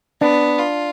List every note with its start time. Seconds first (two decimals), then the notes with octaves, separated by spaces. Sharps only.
0.21 B3 D4
0.58 F4